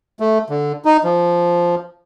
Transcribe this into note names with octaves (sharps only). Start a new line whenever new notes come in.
A3
D3
D#4
F3